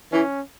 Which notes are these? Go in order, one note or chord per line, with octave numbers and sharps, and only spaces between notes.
E3 C#4